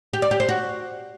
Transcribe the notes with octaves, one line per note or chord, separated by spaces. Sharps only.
G4
D5
G4
C5
F#4